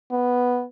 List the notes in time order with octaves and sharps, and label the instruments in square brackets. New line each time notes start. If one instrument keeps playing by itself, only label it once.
[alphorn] B3